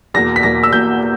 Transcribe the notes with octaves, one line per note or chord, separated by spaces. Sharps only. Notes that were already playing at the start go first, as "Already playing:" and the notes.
E2 B2 A#3 A#6
B6
E2 B2 A#3 A#6
E6
E2 B2 A#3 G6